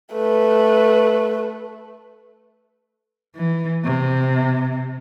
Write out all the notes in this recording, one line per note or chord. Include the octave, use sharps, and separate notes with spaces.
A3 B4
E3
C3